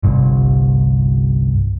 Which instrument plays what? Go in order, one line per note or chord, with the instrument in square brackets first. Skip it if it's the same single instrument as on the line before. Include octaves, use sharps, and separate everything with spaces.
[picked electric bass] G1 C2